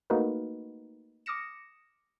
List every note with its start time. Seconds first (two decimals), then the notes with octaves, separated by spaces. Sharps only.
0.10 A3 A#3 D#4 F#4 A#4 B4
1.26 D6 D#6 F6 A#6 C#7 E7